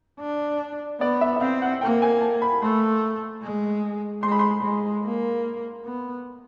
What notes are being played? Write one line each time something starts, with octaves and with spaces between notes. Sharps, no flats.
D4
B3 D5
E5
E5
C4 F5
F#5
A#3 G5
G#5
A5
B5
A3 C6
G#3
G#3 C6
B5
C6
G#3
A#3
B3